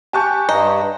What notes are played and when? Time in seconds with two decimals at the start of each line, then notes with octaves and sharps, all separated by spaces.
0.13 G4 G#5 A5 C#6 F#6 G6
0.49 G2 D#5 A#5